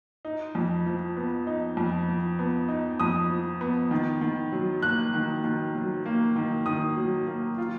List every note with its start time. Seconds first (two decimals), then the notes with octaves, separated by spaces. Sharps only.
0.25 D#4
0.55 F2
0.86 F3
1.17 B3
1.47 D#4
1.77 F2
2.08 F3
2.39 B3
2.69 D#4
3.00 F2 D#6
3.30 F3
3.61 B3
3.91 D#3
4.21 D#3
4.52 F#3
4.83 A#3 F#6
5.14 D#3
5.44 D#3
5.75 F#3
6.06 A#3
6.36 D#3
6.66 D#3 D#6
6.97 F#3
7.27 A#3
7.58 F4